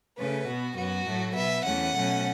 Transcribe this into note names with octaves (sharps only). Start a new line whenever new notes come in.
C#3 A3 C#4 B4
B2 B3 F#4
F#2 F#3 B3 F#4
A2 F#3 A3
B2 B3 E5
E2 E3 A3 C#4 F#5
B2 F#3 A3 C#4